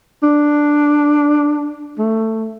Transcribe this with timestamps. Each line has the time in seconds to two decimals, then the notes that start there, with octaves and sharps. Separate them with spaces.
0.23 D4
1.98 A3